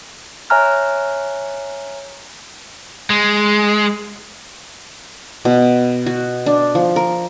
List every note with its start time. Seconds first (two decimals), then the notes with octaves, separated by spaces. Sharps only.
0.50 C#5 E5 G#5 A#5 F6 F#6
3.10 G#3
5.45 B2
6.06 F#4
6.46 D4
6.75 F3
6.96 A#4